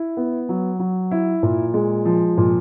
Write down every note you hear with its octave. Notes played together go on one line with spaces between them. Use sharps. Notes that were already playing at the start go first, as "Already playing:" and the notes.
Already playing: E4
B3
F#3
F#3
E4
A#2
G#3
F3
A#2